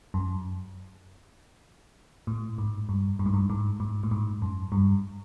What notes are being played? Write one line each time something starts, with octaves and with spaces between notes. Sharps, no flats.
F#2
A2
G#2
G2
G2
G#2
G2
G#2
G#2
A2
G#2
F#2
G2